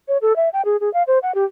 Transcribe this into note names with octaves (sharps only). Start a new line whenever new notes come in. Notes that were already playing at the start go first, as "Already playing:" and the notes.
C#5
A4
E5
G5
G#4
G#4
F5
C5
F#5
G4